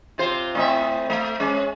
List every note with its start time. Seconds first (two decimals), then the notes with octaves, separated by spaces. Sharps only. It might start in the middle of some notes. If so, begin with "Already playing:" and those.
0.18 C3 F4 C5
0.55 A2 C4 E5
1.10 A3
1.40 G#3 C#4